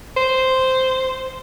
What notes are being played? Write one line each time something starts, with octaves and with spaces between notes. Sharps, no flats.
C5